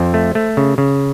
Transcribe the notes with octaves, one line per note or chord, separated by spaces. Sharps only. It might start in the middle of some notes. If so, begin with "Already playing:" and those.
Already playing: F2 C5
A3
A3
C#3
C#3